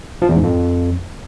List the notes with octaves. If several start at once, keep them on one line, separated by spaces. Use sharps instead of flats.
F3
E2
G#2
F2